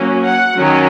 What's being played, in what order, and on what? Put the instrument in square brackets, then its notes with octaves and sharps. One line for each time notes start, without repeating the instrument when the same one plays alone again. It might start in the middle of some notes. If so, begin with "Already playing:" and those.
Already playing: [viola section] F#3 A#3 C#4
F#5
D#3 F#3 C#4